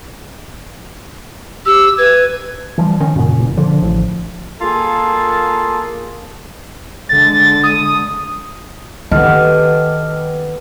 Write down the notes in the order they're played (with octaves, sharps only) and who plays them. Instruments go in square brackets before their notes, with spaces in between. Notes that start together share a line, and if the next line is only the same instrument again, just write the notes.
[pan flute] G4 [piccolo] E6
[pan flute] B4 [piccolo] G#6
[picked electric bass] E3 F3 G3
[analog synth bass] D#3 [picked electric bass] C#4
[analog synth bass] F#2 [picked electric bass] A#2 C#3
[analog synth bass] E1
[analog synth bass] D3 [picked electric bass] F3
[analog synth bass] A1
[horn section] A#3 F4 G#4 A4
[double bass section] D3 G#3 [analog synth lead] A6
[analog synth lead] D#6
[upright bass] D#3 [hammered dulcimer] B3 G4 A4 [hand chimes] D#5 F6